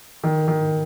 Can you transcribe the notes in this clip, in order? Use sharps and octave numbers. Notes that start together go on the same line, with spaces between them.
D#3
D#3